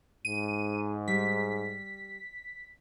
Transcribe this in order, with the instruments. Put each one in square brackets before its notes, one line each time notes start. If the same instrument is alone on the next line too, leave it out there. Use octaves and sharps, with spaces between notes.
[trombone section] G#2 [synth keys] D#7
[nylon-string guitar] G3 [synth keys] B6